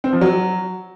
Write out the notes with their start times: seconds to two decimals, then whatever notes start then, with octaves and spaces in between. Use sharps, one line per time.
0.04 C4
0.13 F3
0.21 F#3